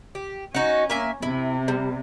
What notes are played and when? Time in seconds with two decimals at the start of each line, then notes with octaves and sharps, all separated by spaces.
0.15 G4
0.55 C#4 D#4 F#4
0.90 A#3 E5 G#5
1.22 C3 E4
1.68 G3